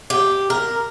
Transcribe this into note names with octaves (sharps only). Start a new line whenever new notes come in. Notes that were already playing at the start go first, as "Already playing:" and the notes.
G4
A#4